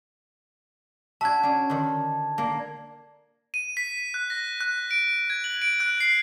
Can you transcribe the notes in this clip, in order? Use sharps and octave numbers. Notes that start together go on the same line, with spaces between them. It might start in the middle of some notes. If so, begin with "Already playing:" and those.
D4 F#4 E5 A5 G#6
C#4 D4
D3 D#3
A#3 D4
D#7
B6
F#6
A#6
F#6
D7
G#6
F#7
D7
F#6
C7